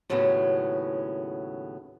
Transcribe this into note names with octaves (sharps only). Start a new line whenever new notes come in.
D#2 A2 C#3 F#3 B3 C#4